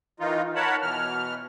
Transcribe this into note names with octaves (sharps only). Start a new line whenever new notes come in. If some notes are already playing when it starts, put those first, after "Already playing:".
D#3 E3 D#4 F4
A#4 C#5 F#5 A5 B5
B2 E3 F6